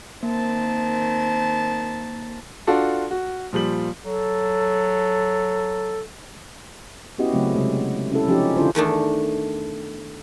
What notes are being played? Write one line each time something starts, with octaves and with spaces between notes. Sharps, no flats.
D#3 A#3 C4 A5
D4 F4 F#4 A4
F#4
A#2 F3 G3 F#7
F#3 A4
B3 C#4 E4 F#4 G4 D#5
C#3 F#3 A3 C4
C3 G#3
C#4 E4 A4
F3 C#4 D#4 G4
D3 D4 E4 F4 C5
E2 D#3 A3 D4